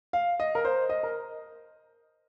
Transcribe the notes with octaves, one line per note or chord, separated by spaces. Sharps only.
F5
D#5
A#4
C5
D#5
A#4